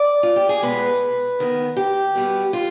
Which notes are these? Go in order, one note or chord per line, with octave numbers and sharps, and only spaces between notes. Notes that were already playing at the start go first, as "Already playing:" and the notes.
Already playing: D5
F4
G4
G#4
B2 G#3 B3 B4
D#2 D#3 B3
G4
B2 G3 B3
F4